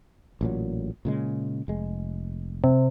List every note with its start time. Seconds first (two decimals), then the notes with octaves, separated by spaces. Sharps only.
0.41 A1 A#2 F#3
1.05 A#2 C#3 G#3
1.68 F1 G#3
2.64 C3